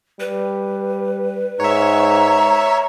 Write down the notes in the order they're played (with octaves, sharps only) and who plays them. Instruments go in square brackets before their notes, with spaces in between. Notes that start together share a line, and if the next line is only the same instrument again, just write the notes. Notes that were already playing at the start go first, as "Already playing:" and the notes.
[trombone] G3 [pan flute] B4
[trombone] G#2 [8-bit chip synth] C#5 E5 [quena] A#5